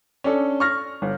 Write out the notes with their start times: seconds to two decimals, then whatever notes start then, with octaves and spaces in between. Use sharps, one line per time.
0.24 C#4 D4 A4
0.60 C#6 F6 A#6
1.02 G1